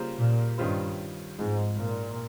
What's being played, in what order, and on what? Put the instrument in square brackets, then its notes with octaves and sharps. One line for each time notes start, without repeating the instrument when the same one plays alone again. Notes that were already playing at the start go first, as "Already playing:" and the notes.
Already playing: [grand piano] C#3 G3 A#3 F4 C5
[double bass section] A#2
[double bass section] G2 [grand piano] D#3 G3 C#4 F4 C5
[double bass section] G#2 [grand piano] F3 G#3 C4
[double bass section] A#2